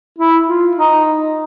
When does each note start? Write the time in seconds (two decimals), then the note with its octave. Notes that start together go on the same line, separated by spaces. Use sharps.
0.19 E4
0.48 F4
0.77 D#4